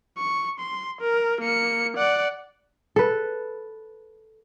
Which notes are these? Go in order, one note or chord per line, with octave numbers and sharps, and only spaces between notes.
C#6
C6
A#4
A#3 C#7
D5 F#5
A4 B4